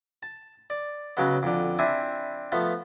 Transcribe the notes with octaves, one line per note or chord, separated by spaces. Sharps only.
A5
D5
C#3 F#3 G#3 B3
F2 D3
C4 D4 E4 E5 G#5
F3 A3 B3